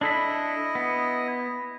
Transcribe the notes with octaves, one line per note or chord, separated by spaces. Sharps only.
D4 E4 A4 D#5 B5
B3